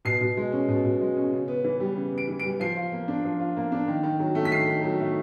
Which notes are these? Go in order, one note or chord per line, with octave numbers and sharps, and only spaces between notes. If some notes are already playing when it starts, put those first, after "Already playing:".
B2 C7
B2
G#3
C#4
B2
B2
G#3
C#4
C#3
B3
E3
G3
C#3
B3
D7
E3
G3 D7
F3 C7
F4
A#3
D4
F3
F4
A#3
D4
D#3
D#3
F#3
A3
B6
D#3 C7
D#3
F#3
A3